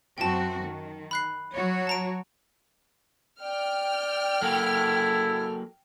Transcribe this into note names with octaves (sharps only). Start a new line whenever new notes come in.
F#2 C4 F#4 G5 A5
D#3
B5 F#6 C7
F#3 F#4 C#5
A5 A#5 D7
D5 G5 F6
F#3 A#3 E4 F#4 A4